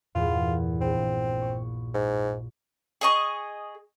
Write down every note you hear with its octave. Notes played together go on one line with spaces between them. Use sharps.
E2 G2 A#2 F4
A#1 C4
C#6
G#2
G#4 D#5 C#6